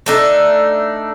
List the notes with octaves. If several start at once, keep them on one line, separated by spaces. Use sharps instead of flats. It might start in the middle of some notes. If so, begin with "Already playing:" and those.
A3 D4 D#4